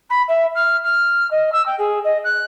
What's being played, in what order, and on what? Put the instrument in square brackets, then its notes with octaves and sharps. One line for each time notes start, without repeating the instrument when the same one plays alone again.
[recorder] B5
E5
F6
F6
D#5
E6
G5
G#4
D#5
F#6